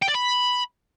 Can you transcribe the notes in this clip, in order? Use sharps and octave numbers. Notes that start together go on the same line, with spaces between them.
G5
D5
B5